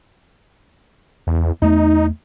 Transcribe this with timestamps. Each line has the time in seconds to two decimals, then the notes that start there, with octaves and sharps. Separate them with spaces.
1.27 E2
1.62 E2 A3 D#4